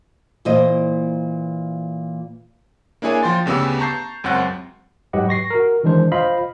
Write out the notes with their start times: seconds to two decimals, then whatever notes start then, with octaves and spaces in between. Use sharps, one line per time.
0.45 A#2 E3 A#3 C5 D#5
3.02 A#3 D4 E4 G#4 C#5 G#5
3.23 F3 G5 C6 A6
3.46 D2 C#3 B3 G4 E6
3.79 A5 A#5 C#6 G6 C7
4.24 C#2 F#2 C4 F#5 A6
5.13 G#2 F#3 G4 B4 D#5 F#5
5.29 C#6 A#6 C7
5.50 F#4 A#4
5.84 D#3 E3 G#3 D4 C5
6.12 F4 C5 D#5 F5 B5